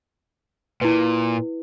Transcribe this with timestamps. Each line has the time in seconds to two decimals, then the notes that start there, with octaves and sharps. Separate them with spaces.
0.81 A#2 E4 B4